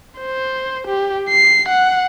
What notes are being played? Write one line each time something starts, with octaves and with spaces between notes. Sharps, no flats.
C5
G4
C7
F#5